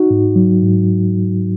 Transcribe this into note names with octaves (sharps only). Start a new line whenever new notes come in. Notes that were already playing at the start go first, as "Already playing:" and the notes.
Already playing: D#4 F#4
G#2
F#3
G#2